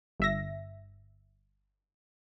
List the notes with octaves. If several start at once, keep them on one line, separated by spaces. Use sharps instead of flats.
G1 E5 A#6